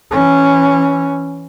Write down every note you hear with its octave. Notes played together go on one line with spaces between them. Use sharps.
E3 C#4